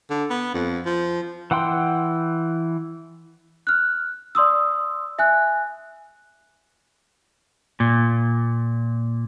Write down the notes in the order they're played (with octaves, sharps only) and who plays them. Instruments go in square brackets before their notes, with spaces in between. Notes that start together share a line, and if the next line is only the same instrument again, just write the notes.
[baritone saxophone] D3
B3
F2
F3
[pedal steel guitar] E3 F#5 G5 C6
[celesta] F6 F#6
D5 C6 D#6 E6
E5 G#5 F#6
[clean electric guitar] A#2